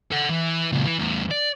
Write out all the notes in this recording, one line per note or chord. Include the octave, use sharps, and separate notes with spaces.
A4 F#5
E3
C#2 A#2
E3
E2 A2
D5